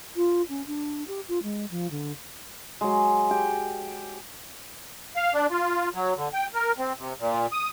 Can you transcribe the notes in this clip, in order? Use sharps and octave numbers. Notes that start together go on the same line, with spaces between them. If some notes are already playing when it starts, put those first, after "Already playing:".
F4
C#4
D4
G4
F4
G#3
F3
D3
F#3 G#3
G4 G5
F5
D4
F4
F#3
D3
G5
A#4
C4
C3
A#2
D#6